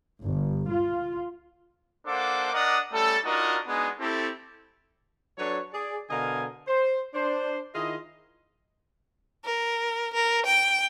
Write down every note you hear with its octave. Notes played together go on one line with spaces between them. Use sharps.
G1
F4
A#3 D4 A4 C5 F#5 D6
D4 A#4 D#5 F#5 D6 D#6
G3 A3 C#4 A4
D4 D#4 F4 F#4 A#4 D#5
G#3 B3 D4 D#4 F#4 G#4
A3 C4 E4 G4 A4
F#3 D4 A4 B4 C#5
G#4 D5
B2 D3 A#4 D#5 F5 G#5
C5
D4 C5
D#3 E4 F4 G#4 D#5
A#4
A#4
G5